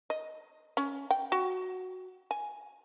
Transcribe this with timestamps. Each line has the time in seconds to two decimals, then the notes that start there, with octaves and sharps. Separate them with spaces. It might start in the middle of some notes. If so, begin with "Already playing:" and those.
0.10 D#5
0.77 C#4
1.11 G5
1.32 F#4
2.31 G#5